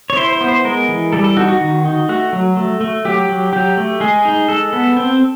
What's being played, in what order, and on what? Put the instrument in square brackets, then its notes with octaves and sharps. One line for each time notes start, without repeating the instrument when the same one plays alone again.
[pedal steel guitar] C#5
E4 C5
C5
B3
C5
G#3 A#4
E3
G3 A4
A4
D#4 F#4
F#4
D#3
D#4
A3 F#4
F#3
A3
A3
F#3 G4
F#3
F#3 G4
A3
G#3 G#4
D#4
G#3 A4
B3
C4